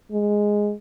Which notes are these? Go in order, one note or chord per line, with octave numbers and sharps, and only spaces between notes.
G#3